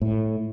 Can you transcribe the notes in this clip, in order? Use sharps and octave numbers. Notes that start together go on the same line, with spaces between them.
A2